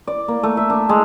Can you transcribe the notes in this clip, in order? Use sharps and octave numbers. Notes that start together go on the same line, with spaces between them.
D5
A#3
A3
E5
D4
G#3